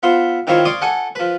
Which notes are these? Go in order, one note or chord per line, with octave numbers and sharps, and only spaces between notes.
B3 F4 C5 E5
D#3 C4 E4 F4 C5 C#5
C#5 D5 F5 C6 D6 D#6
A4 F#5 G#5 D6
F3 B4